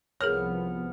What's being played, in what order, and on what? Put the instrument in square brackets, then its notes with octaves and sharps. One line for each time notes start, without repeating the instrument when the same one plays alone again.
[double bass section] C2 F3 B3 [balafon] G#4 A#4 C#5 [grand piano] F6